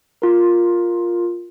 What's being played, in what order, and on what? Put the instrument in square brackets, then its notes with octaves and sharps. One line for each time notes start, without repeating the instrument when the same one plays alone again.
[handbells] F4 A#4